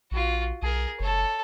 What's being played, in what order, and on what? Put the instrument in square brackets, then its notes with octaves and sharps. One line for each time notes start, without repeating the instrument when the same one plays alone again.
[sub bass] A#1 [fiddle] F4 F#4
[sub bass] B1 [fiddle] G#4 A#4
[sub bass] F#1 [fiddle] A4 C#5